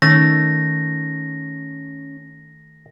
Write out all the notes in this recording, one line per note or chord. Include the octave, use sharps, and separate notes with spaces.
D#3 A3 C#4 A#6